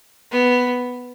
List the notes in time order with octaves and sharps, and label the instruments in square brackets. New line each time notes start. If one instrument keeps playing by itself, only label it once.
[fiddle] B3